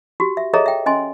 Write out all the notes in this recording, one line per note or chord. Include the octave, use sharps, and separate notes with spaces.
F#4 G4
E5
G#4 A4 C#5 D#5 E5 A#5
E5 G5
C#4 D#5 G#5 C6